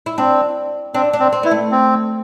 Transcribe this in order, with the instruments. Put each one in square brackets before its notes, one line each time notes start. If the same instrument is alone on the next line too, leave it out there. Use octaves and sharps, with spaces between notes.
[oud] E4
[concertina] C4 [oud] D4
[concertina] C4 [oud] D4
[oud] D4
[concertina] C4
[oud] C4
[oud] B3 [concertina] E4
[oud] A3
[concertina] C4